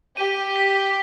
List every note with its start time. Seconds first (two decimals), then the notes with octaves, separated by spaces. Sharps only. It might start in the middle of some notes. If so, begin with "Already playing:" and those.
0.17 G4 D#7
0.56 B6